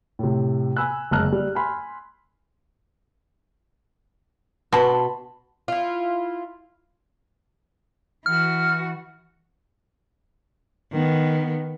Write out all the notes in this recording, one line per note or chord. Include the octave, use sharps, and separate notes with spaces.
A2 C3
G#5 B5 E6 F#6
F#1 G#3 A5 A#5 F6 F#6
G3
G#5 B5 C6
B2 A5 B5 C6
E4 F4
E3 F#4 F6
D#3 B3